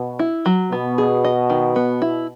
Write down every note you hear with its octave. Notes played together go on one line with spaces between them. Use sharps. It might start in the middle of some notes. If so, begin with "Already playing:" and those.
Already playing: B2
E4
F#3
B2 B3
G#4
D#5
D#3
B3
E4